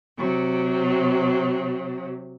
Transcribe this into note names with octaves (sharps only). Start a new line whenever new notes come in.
C3 F#3